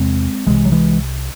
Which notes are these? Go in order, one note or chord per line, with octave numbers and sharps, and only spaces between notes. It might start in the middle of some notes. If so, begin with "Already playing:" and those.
Already playing: E2 C3 G#3 C4
C2 C3 E3 G#3
F#3
E3 G#3